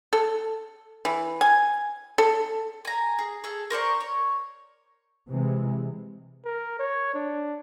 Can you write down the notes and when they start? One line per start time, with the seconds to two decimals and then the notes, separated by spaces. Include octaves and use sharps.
0.13 A4
1.05 E3
1.41 G#5
2.18 A4
2.85 G#5 A#5
3.19 G#4
3.44 G#4 A4
3.70 A#4 C5 D5 C#6
4.00 C#5
5.30 C3 E3 G#3
6.45 A#4
6.80 C#5
7.15 D4